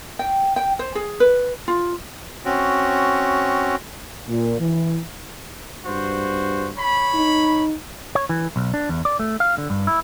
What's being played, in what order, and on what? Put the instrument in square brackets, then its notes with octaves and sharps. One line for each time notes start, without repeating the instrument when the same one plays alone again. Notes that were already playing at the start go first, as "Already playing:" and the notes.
[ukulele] G5
G5
C5
G#4
B4
F4
[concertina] C4 C#4 F#4
[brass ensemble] A#2
E3
[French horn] G2 [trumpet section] F#4 C5
[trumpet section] C#5 B5
[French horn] D#4
[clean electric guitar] C#5
E3
B1
D4
E2
D5
A3
F5
D3
G2
E4